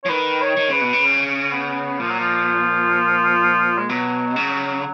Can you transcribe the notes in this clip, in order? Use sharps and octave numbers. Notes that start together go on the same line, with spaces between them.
F3 C#5
D#3 B4
C#5
D#3
C#3 B4
B2
C#3
C#4
B3
A#2 F3
F#3
F3
G#3
B2 F#3
C#3